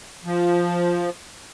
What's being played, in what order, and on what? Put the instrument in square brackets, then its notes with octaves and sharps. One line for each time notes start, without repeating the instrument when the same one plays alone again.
[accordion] F3